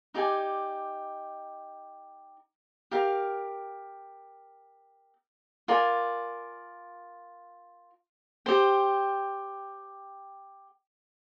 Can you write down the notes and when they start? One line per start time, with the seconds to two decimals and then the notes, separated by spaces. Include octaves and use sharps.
0.14 D#4 G4 D5 G#5
2.91 G4 A#4 F5
5.68 F4 A#4 D5 G#5
8.46 G4 C5 G5